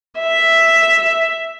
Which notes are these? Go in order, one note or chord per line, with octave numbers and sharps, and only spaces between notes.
E5